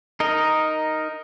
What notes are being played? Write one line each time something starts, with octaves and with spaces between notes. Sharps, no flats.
D#4 A#4 D#5